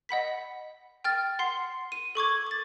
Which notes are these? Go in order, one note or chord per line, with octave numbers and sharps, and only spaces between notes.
D#5 F#5 B5 B6
G5 F6 A6
F#5 C6 C7
D#7
A4 C#6 D6 G#6
D6 A6